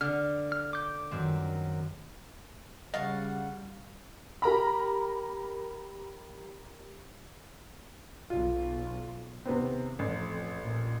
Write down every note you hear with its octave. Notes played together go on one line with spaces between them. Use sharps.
D3 F6
F6
D6 G6
F#2 D#3 C4
C#3 G3 D#5 F5 F#5 A5 C#6
G4 A#4 A#5 B5
B1 F4
D#2 C3 B3 C4
A1 F2
A#1 A#2